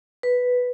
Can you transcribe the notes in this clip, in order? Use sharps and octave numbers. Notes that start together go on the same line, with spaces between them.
B4